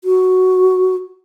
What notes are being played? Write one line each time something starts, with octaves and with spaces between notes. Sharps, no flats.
F#4